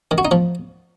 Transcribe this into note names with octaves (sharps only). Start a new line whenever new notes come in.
D#3
F#4
D#4
F3